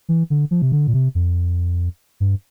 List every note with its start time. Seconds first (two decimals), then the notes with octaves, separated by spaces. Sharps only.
0.09 E3
0.30 D3
0.51 F3
0.62 C3
0.72 D3
0.87 A#2
0.94 C3
1.15 F2
2.20 G2